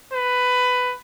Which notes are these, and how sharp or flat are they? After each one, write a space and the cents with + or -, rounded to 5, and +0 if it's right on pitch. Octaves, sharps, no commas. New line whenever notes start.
B4 +15